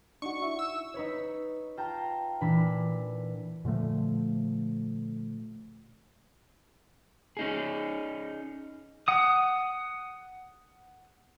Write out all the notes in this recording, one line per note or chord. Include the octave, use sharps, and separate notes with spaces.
D4 D#4 F#4 C#6
E4 E5
E6
D#4 B4 C#5
F4 G5 A5 A#5
A#2 E3 D4 B5
A#2 D3 F3 A3
C#4 D#4 G#4
F#5 D#6